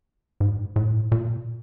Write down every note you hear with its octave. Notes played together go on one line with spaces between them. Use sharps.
G#2
A2
A#2